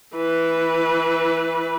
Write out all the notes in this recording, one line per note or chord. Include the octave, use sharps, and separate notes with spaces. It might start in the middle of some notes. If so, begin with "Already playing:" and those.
E3 B4